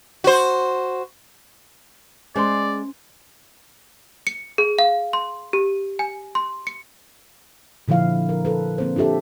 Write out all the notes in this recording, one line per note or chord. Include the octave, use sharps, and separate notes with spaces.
F#4 C5
G#3 C#4 C5 D5 C6
C#7
G#4
F5
C6
G4
G#5
C6
C#7
A#2 D3 F3 E4 F5
A#4
A4 B4
A#3 C4 C5
D4 F4 G4 A4 E5